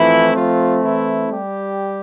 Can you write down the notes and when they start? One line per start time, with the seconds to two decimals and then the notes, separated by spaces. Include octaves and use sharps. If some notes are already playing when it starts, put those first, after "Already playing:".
Already playing: E3 F3 A3 C4 E4
0.35 F3 F4
0.83 E3 E4
1.31 G3 G4